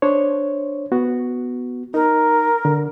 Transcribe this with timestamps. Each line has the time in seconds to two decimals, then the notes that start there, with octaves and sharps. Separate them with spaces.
0.02 D4 C5 C#5
0.92 B3 F#4
1.94 D#4 A#4
2.65 D3